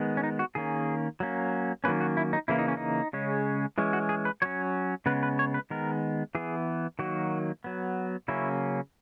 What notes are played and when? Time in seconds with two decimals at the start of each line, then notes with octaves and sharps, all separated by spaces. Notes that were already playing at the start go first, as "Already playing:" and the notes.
Already playing: D#3 G#3 B3
0.17 C#4
0.23 D#4
0.39 F#4
0.55 D#3 A#3 C#4 G#4
1.20 F#3 A#3 C#4
1.84 D#3 F#3 A#3 C#4 B4
2.01 F#4
2.17 E4
2.33 D#4
2.48 C#3 E3 A#3 E4
2.59 D#4
2.68 C#4
2.77 D#4
3.13 C#3 G#3 C#4
3.78 E3 G#3 C#4
3.93 F#4
4.09 G#4
4.25 B4
4.42 F#3 C#4 C#5
5.06 C#3 G#3 B3 B4
5.23 B4
5.39 C#5
5.54 B4
5.70 D#3 G#3 B3 A#4
6.35 E3 B3 G#4
6.99 D#3 F#3 A#3 F#4
7.64 F#3 B3
8.28 C#3 F#3 A#3 C#4 E4